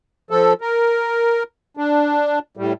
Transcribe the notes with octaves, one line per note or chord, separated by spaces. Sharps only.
F3 A4
A#4
D4
A2 G3